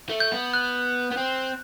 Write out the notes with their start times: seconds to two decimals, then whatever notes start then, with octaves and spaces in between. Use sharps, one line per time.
0.10 A3
0.20 G6
0.32 B3
0.54 F#6
1.11 B3
1.17 C4